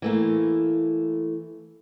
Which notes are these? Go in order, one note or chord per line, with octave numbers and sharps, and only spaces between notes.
E3 A3 A#3